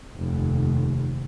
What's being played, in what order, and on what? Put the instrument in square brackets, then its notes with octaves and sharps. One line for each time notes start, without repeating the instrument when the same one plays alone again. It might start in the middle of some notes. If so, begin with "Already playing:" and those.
[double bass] F1 D#2